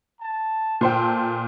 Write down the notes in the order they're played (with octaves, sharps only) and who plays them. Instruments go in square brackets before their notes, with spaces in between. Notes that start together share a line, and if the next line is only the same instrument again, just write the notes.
[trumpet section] A5
[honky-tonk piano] A#2 C5 G5 [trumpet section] A4